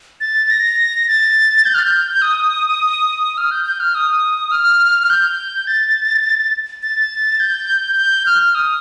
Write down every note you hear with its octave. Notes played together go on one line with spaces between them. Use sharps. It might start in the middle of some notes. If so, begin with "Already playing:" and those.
A6
A#6
A6
G6
F6
G6
D#6
F6
G6
G6
F6
D#6
F6
F6
G6
A6
A6
G6
G6
F6
D#6